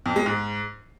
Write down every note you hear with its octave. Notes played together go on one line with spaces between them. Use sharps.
F2
G#3
G#2